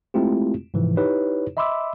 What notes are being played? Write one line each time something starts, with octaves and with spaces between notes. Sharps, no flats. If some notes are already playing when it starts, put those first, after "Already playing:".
G#3 A3 C4 E4 F4 G4
G#2 C3 E3 F3
D#4 E4 G4 B4 C#5
D#5 E5 B5 C6 D6 E6